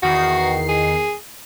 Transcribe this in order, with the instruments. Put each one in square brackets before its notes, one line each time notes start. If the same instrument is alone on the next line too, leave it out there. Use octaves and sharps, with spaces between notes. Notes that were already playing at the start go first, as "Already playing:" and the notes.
[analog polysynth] E2 D#3 C7 [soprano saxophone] F#4
[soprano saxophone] G#4